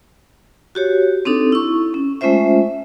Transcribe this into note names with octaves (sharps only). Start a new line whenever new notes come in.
F#4 G4 C#5
C4 D4 D#4 A4
E4 C#6
C#4
G#3 A3 C#4 F4 C5 E5